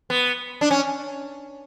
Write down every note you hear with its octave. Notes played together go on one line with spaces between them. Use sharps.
B3
D4
C#4